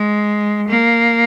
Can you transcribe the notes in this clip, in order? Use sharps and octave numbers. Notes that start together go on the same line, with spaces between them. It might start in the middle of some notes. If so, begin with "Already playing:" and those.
Already playing: G#3
A#3